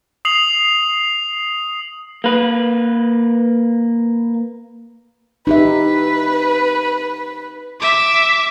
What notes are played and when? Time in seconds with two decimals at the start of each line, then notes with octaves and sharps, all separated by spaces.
0.25 D#6 C7 F7 F#7
2.24 A#3 B4
5.47 D#4 G4 B4 E5
7.80 E5 D6